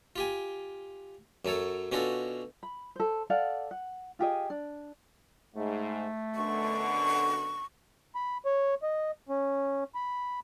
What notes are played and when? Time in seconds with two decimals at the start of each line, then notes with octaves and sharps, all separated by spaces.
0.16 F4 G4 G#5
1.45 F#2 F#3 A4 C#5
1.92 B2 C#4 D4 F4 F#4 A4
2.63 B5
2.96 A4 C5
3.30 A4 D5 F5 F#5
3.71 F#5
4.19 F4 G4 G#4 D#5
4.50 D4
5.56 G#2 A3
6.35 F#2 B2 D3 C#6
8.15 B5
8.46 C#5
8.83 D#5
9.29 C#4
9.95 B5